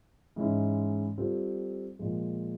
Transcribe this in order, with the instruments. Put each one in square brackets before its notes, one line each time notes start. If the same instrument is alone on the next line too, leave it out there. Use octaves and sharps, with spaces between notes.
[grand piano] G#2 E3 G#3 C#4 E4
G3 C4 F4 A4
A#2 F3 G#3